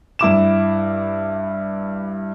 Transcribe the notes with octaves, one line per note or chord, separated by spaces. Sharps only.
G2 E4 D6 E7